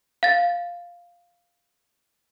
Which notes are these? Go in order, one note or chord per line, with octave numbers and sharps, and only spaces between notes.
F5 A6